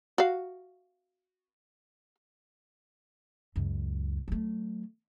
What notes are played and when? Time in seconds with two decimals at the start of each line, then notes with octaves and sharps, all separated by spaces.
0.18 F#4 F5
3.56 C#2 F#2
4.28 F#3 A3